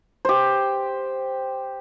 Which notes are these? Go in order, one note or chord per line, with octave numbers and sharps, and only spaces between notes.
G4 C5